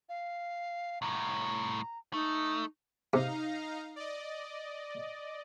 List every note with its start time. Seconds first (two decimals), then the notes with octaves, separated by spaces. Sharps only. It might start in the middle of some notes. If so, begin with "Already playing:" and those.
0.09 F5
1.02 C2 A2 A#5
2.13 A3 D#4
3.13 C3 D#4 F5 A#5
3.96 D5 D#5